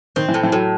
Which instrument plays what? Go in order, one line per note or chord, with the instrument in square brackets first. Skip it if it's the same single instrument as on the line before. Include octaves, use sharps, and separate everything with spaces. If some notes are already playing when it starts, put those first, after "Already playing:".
[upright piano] D#3 [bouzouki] C4
[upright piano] E3
[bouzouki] A2
[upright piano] E3
[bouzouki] A2 [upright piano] F#3